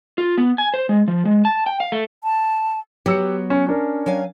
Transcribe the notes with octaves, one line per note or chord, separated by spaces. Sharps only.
F4
B3
G#5
C5
G#3
F3
G#3
A5
G5
F5
A3
A5
F#3 B3 G4 E6 C#7
C#4
C#4 D4 A#4
F#3 F5 G#5